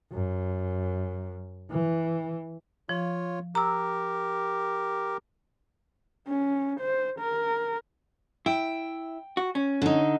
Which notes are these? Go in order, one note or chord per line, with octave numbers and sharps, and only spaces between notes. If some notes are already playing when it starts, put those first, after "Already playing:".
F#2
E3
F3 F4 C#5
G4 A#4 A#5 E6
C#4
C5
A#4
E4 G5
F#4
C#4
D3 D#4